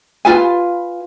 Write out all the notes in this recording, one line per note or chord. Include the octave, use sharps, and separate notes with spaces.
F4 B4 G#5